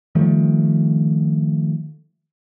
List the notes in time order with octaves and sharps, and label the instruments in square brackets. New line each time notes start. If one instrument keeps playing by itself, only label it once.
[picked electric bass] D#3 F3 G3 A3